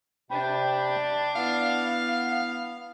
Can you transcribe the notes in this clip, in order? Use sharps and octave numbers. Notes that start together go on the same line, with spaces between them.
C3 D4 G5 B5
B3 E4 F5 F#5